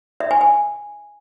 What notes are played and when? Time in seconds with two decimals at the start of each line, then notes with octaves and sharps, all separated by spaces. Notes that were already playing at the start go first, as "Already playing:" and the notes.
0.20 E5
0.31 G#5
0.41 G#5